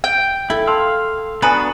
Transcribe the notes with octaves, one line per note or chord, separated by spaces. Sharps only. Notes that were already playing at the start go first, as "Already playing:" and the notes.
G5
E4 A4
F5 A5 C6 E6
B3 D4 F#4 B4 G#5 A#5 D#6